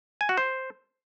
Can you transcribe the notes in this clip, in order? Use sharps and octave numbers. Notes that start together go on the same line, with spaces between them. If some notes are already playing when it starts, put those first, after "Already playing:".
G#5
F#4
C5